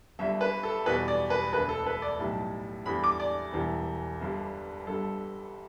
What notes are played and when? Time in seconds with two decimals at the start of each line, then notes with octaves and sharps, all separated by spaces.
0.19 G1 G2 D3 G3 E5
0.41 B4
0.63 A4
0.86 E2 B2 G3 B4
1.08 D5
1.30 B4
1.53 E1 D2 D3 B4
1.69 A4
1.86 B4
2.02 D5
2.19 B1 A2 G3 A5
2.86 E2 D3 G3 B5
3.04 D6
3.20 D5
3.53 E1 E2 E3 G3
4.20 G1 G2 D3 G3
4.87 G1 G2 G3 A4